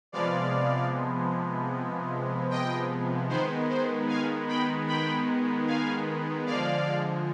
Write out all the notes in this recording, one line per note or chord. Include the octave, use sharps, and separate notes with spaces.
C3 F3 G#3 B3 D5 F5
D#5 G5
D#3 G#3 B3 C5
C5
F5 G#5
G5 B5
G5 B5
F5 G#5
D3 F3 G#3 D5 F5